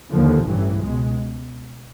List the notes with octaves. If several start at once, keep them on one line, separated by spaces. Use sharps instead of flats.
D#2 D3 F3
A1 G2 E3
C#2 B2 G#3